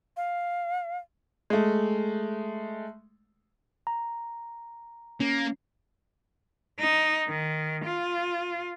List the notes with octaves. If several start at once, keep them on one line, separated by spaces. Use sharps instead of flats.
F5
G#3 A3
A#5
A#3 C#4
D#4
D#3
F4